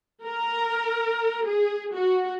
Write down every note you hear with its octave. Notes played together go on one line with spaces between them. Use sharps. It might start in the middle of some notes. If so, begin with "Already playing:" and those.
A#4
G#4
F#4